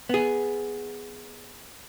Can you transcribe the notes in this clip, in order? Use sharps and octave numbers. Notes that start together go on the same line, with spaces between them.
B3 G#4